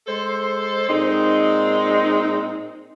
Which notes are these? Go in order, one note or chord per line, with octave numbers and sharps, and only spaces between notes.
G#3 A4 C5
A#2 G#3 C4 D#4